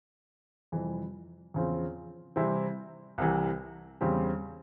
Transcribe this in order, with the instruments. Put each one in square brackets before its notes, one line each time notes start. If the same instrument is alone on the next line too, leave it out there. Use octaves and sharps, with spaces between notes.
[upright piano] F2 C3 E3 G3
E2 C#3 F3 C4
C3 E3 G3 C4 E4
C2 C3 E3
E2 C#3 G3 C4 G4